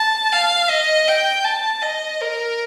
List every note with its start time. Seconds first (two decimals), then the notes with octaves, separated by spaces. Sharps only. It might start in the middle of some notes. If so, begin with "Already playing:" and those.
Already playing: A5
0.32 F5
0.70 D#5
1.08 G5
1.45 A5
1.83 D#5
2.21 A#4